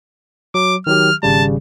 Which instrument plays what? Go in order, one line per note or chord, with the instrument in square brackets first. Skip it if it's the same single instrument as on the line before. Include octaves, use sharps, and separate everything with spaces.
[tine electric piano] F#3 [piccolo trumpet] D6
[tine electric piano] D#3 F#3 G4 [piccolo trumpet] F6
[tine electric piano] G#1 C#3 G3 [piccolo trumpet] A5